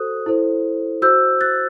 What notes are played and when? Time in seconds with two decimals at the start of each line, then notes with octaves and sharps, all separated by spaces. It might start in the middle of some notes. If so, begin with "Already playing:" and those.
Already playing: F#4 A4 C5 D#6 F#6
0.26 E4 A4 C5
1.02 F#4 C5 E6 G6
1.41 F#6 A6